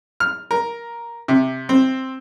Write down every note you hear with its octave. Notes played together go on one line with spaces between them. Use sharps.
F6
A#4
C3
C4